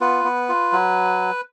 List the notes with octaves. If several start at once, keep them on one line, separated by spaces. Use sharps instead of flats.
B3 F4 B4
B3
F4
F#3